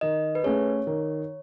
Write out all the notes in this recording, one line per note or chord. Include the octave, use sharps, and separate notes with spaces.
D#3 D#5
B4
A3 C#4 G#4 C#5
D#3